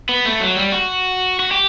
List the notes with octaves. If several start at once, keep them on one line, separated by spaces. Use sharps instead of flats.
B3
A3
F#3
G3
F#4
F#4
G4